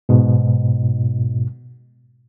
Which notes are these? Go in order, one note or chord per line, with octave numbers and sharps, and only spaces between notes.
G#2 B2